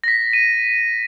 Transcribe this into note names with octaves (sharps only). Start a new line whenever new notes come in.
A#6 B6
D#7